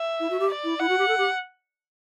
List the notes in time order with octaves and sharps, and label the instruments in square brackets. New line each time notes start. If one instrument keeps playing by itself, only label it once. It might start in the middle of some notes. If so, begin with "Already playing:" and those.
Already playing: [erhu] E5
[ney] E4
F#4
G4
[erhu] D5
[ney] E4
[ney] E4 [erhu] F#5
[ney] F#4
G4
A4
G4